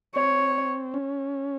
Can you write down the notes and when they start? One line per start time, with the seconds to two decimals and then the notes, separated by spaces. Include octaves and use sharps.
0.16 C4 C#5
0.94 C#4